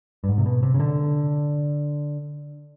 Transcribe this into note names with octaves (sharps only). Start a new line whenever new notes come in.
G2
G#2
C3
B2
C3
C#3
D3